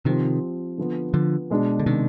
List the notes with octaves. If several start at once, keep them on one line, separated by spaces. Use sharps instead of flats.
C3 D#3 F3 C4 G4
D3 F3 B3
D3 F3
B2 G#3 D4
D3
C3 D#3